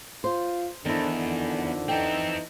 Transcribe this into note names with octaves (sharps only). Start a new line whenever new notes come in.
F4 C5
E2 D3 D#3 D4 E4 A4 C5
F2
E3 C4 D#4 A4 G5